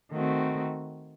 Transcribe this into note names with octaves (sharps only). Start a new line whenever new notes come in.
D#3 A3 C4 F#4